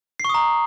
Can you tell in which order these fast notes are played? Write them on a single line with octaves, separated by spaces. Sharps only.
C7 C#6 D#6 A#5